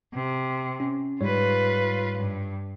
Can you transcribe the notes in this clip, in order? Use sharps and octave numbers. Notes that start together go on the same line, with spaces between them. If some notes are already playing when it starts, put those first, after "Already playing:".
C3
C#4
G#2 G3 F4 B4 C#5
G2